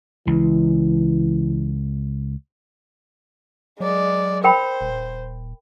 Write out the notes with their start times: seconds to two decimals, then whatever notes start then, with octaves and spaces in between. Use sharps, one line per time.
0.27 C#2 E3
3.80 F#3 G#3 D5
4.44 A#4 C5 G5 B5
4.81 D#1